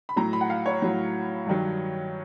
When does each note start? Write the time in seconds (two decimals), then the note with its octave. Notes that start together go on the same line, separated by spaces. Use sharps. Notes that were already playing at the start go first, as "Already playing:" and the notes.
0.09 B5
0.16 A2 F#3 A#5
0.33 B5
0.41 F#5
0.50 F5
0.66 C#5
0.82 A2 F#3
1.46 G2 D#3 F#3